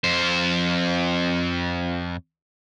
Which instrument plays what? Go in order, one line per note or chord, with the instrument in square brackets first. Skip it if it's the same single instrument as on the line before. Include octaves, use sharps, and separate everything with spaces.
[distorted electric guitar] F2 C5